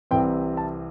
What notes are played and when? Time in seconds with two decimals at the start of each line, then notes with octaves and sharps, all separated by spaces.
0.11 C2 C3 E3 C4 G5
0.57 A5